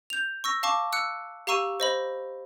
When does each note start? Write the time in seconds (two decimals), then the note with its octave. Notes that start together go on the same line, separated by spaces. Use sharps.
0.10 G6 F7
0.44 C#6 E6 A#6
0.63 F5 A5 C#6 D6
0.92 E6 F#6 C#7
1.47 G4 F5 A#5 C#6 E6 D#7
1.80 C5 D#5 B5